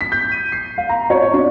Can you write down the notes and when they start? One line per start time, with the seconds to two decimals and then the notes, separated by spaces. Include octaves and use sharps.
0.01 B6
0.12 G6
0.32 D#7
0.52 C7
0.78 F5
0.89 A#5
1.10 C#5
1.34 D4